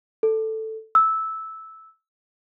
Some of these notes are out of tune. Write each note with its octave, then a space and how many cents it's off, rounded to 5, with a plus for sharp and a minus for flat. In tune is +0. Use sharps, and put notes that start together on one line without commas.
A4 +5
E6 -10